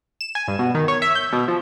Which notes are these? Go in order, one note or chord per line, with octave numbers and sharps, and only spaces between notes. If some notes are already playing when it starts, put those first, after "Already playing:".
E7
G#5
G2
B2
D#3
C#5
E5
G6
B2
F3